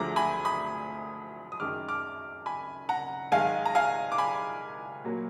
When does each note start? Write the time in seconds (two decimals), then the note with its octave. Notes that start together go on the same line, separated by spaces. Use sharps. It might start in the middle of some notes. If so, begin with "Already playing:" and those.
Already playing: D2 D3 F3 G#3 A#5 D6
0.16 G#5 B5
0.45 B5 D#6
1.52 D#6
1.60 F#2 D#3 G#3 D6 F6
1.88 D6 F6
2.46 G#5 B5
2.89 F#5 A#5
3.32 G#2 D#3 G#3 F5 G#5
3.65 A#5
3.75 F5 G#5
4.12 D6
4.18 G#5 B5
5.04 A#2 F#3 A#3